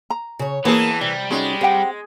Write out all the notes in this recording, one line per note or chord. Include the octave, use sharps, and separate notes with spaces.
A#5
C#3 C#5
E3 A#3 B3 G#4 A5
C3 G3
G#3 C#4 D#4 F#4
C4 G4 F#5 G5